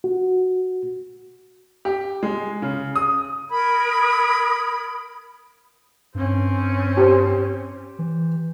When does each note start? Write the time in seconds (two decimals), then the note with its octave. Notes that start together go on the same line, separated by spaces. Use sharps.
0.04 F#4
1.85 G4
2.23 G#3
2.62 C#3
2.96 D#6
3.50 A#4 B5 D#6 G#6
6.15 G2 C4 C#4
6.97 G4 C5
7.99 E3